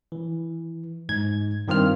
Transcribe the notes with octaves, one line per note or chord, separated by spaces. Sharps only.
E3
G#2 G#6
G2 D#3 C4 F4 F6